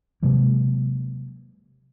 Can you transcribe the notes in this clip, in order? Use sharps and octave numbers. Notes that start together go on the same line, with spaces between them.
C3 F#3 G#3 A#3